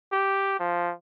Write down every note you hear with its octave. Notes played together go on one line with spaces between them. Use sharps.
G4
F3